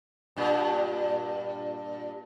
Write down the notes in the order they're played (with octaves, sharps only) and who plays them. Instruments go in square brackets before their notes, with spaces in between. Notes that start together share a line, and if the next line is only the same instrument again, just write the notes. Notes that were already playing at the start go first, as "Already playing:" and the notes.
[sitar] G2 A#2